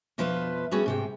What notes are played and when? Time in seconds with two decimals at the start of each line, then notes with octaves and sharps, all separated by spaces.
0.18 F2 B2 F3 F4 B4 E5
0.71 G3 A3 B3 C#4 F#4 G#4
0.86 G#2 C3 G5